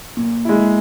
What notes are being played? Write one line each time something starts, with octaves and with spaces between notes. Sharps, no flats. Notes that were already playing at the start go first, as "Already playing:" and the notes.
A#2
G#3 E4